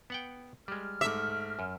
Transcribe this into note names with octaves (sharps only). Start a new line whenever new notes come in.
B3 F#5 G5
G3 G#3 F6
G#2 A3 E5 D6
F#2